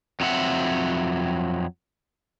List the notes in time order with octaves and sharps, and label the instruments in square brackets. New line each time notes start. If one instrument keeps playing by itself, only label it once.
[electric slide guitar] F2 F#3 C4 E5 F#5